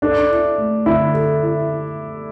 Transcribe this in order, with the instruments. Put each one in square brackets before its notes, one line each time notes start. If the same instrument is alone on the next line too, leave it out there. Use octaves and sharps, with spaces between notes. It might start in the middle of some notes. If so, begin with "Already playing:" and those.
[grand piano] D4 [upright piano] A4
[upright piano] E4
A3
[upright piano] D3 [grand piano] E4
[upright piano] A4
E4